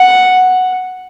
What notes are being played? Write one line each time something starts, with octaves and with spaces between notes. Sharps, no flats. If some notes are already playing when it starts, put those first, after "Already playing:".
Already playing: F#5